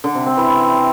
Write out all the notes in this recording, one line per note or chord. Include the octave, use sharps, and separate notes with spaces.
D3
C3
C4
E3